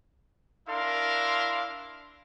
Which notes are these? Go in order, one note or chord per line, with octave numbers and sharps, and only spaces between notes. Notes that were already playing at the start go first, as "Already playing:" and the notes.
D4 E4 A#4 F5 C6